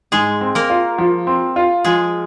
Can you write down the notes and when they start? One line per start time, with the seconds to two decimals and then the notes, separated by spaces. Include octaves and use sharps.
0.12 G#2 G#3 G#4
0.41 C4
0.55 A#3 A#4
0.70 F4
0.98 F3
1.27 C4
1.56 F4
1.84 F3 G#3 G#4